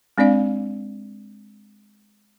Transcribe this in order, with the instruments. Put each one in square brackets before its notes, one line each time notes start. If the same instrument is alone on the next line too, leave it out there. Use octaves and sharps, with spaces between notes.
[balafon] G#3 C4 D4 D5 F5